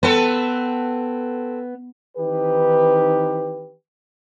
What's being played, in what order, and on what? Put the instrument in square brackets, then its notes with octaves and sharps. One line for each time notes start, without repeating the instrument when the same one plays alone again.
[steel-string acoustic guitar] B3 [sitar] C4 A4 B4
[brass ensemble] D#3 E3 C4 D#4 G4 B4